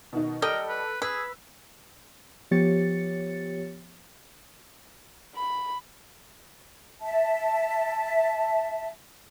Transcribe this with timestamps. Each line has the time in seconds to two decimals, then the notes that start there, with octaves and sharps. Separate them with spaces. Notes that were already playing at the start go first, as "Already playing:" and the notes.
0.13 B2 D#3 D#4
0.42 G3 A4 A#4 D#5 G5
0.68 B4
1.02 G#4 B4 E6
2.51 F3 B3 G4 C#5 A6 C#7
5.35 B5
7.01 E5 A5